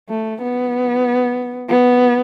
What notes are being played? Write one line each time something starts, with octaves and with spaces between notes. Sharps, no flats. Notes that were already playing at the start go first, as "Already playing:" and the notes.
A3
B3
B3